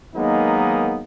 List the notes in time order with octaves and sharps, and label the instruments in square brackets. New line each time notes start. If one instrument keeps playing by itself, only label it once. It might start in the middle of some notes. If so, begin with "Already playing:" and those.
[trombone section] D#3 F#3 G#3 A#3 B3 D#4